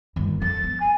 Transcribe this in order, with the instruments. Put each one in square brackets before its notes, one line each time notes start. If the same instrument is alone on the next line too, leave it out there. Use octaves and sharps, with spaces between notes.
[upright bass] G1 D#2
[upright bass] F2 [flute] A6
[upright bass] B3
[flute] G#5